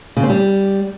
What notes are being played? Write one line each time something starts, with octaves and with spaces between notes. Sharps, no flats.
C#3
C4
G3